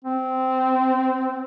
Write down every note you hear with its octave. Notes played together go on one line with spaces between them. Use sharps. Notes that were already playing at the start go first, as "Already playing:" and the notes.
C4